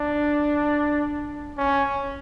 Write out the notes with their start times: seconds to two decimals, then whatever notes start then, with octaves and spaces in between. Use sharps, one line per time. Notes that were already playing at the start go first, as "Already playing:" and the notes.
Already playing: D4
1.58 C#4